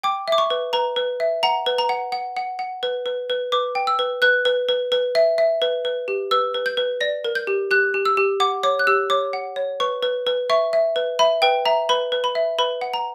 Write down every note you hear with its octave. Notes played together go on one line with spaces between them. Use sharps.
G5 D6
E5 D6
C#6
B4
B4 A#5
B4
E5
F#5 A#5
B4
A#5
F#5
F#5
F#5
F#5
B4
B4
B4
B4 D6
G5
E6
B4
B4 F#6
B4
B4
B4
E5
E5
B4
B4
G4
B4 E6
B4
G6
B4
D5 A#6
A#4
G6
G4
G4 F#6
G4
E6
G4
F#5 D6
C#5 D6
F#6
G4 E6
C#5 D6
F#5
C#5
B4 C#6
B4
B4
E5 C#6
E5
B4
E5 B5
B4 G5
E5 A#5
B4 B5
B4
B5
E5
B4 B5
F#5
A#5